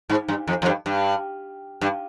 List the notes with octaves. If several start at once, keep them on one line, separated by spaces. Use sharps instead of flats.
G#2
G2
F2
F2
G2
G2
G2